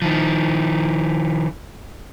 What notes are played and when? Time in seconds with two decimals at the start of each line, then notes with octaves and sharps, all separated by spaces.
0.02 D#3 F3